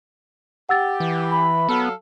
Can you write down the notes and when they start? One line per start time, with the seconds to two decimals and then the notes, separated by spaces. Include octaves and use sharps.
0.69 G4 F#5 E6 A6
1.00 E3
1.31 B5
1.69 F#3 B3 A4 F5